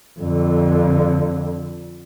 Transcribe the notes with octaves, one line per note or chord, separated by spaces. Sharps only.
F2 D3